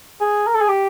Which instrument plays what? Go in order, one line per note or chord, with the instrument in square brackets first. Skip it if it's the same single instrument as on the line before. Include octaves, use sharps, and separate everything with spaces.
[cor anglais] G#4
A#4
A4
G#4
G4